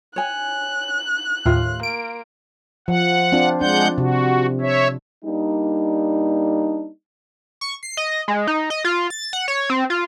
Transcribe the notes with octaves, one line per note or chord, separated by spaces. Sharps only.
C#5 G#5 F#6
D#2 A2 F4
A#3 D7
F3 F#5
C4 D4 F4
G#3 D4 F#5 G6
C3 F#4
C#5 E5
G3 A#3 D4 D#4
C#6
C7
D#5
G#3
D#4
D#5
F4
A6
F#5
C#5
C4
F4